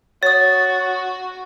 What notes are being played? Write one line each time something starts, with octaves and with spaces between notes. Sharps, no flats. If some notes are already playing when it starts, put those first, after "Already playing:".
F#4 C#5 D#6 A6